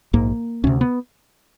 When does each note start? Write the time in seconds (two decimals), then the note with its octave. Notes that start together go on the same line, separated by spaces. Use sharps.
0.13 A#1 G#2 A#3
0.64 D2 C3 C#4
0.81 B3